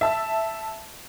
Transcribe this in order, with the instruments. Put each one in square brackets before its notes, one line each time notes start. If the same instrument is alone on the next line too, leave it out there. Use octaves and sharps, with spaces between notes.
[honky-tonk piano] E5 A5 E6